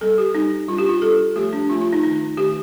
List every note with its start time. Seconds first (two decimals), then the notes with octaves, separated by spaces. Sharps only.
0.01 G3 C4 A4
0.18 G4
0.35 G3 C4 D#4
0.68 G3 D4 F4
0.78 G4
0.89 F4
1.02 G3 D4 A4
1.36 F3 A3 C4 G4
1.53 D4
1.69 F3 A3 C4 F4
1.81 F4
1.93 D#4
2.03 D#3 A3 C4 D#4
2.37 D#3 A3 C4 G4